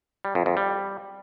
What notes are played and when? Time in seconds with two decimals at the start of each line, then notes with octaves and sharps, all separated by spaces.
0.25 G3
0.35 F2
0.46 F2
0.57 G3